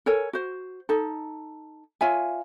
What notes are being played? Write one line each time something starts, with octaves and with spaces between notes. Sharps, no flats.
A4 A#4 C#5 G#5
F#4 C5
D#4 A4
F4 C#5 E5 G#5